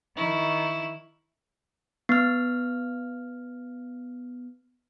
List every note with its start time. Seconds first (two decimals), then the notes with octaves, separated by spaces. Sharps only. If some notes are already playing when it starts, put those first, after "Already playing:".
0.17 D#3 E4 C#6
2.09 B3 F6